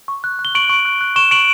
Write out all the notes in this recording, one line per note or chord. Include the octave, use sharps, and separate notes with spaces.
C#6
F#6
F#6
G7
C#6 D7 F#7
C#6
F#6
F#6
C#6 E7 G7
C#6 D7 F#7